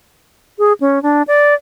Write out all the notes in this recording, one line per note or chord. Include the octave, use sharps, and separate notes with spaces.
G#4
C#4
D4
D5